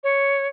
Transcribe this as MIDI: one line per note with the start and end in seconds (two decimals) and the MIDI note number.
0.04 0.47 73